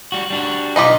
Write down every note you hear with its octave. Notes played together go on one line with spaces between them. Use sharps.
G3 F#4
G3 D4 F#4
B1 D3 D#4 F4 G4 D#5